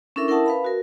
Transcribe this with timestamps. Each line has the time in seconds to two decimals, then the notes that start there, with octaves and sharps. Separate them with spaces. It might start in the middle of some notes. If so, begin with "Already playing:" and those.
0.16 C#4 D4 E4 A4 A#4 E5
0.28 E4 A#4 E5 F#5 A5 D#6
0.46 B4 F5 B5
0.65 F#4 A#4